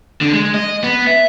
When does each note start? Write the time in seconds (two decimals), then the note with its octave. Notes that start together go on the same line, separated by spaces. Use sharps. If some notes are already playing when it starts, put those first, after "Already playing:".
0.21 D3
0.33 G#3
0.54 D#5
0.84 B3
1.07 E5